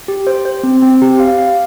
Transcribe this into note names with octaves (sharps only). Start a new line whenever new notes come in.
G4
C5
C5
C4
C4
G4
F5
F5